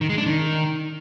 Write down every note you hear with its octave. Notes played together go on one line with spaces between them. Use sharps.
D#3
G#3
D4
D#3